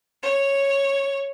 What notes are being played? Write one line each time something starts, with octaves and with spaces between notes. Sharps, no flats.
C#5